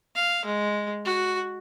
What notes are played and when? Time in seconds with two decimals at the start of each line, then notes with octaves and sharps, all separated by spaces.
0.16 F5
0.45 G#3
1.05 F#4